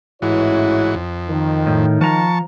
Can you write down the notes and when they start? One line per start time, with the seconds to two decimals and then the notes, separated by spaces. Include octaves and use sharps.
0.22 A1 G#2 E3 E4 F#4 C#5
0.95 F2
1.29 D#3
1.67 A2
2.01 F3 A5 A#5 C#6